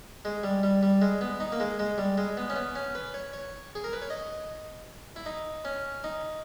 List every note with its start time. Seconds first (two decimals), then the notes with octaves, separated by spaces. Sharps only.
0.25 G#3
0.43 G3
0.63 G3
0.83 G3
1.02 G#3
1.21 B3
1.40 D#4
1.52 A#3
1.60 G#3
1.79 G#3
1.98 G3
2.18 G#3
2.37 B3
2.50 C#4
2.56 B3
2.75 C#4
2.95 B4
3.14 C#5
3.33 C#5
3.75 G#4
3.84 A#4
3.93 B4
4.02 C#5
4.10 D#5
5.16 E4
5.26 D#4
5.65 C#4
6.04 D#4